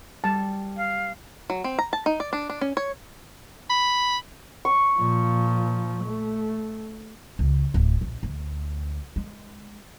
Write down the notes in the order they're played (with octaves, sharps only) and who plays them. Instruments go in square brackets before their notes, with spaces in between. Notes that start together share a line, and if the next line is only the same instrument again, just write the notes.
[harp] G3 [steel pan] A5
[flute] F5
[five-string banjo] F#3
C4
A#5
A5
D#4
D5
D4
D4
C#4
C#5
[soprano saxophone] B5
[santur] C#6
[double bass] A#2 F3
A3
[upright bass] C#2
D1 A2
A#1
D2
G#3